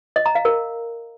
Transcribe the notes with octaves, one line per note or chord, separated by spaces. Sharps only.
D#5
A#5
F5
A#4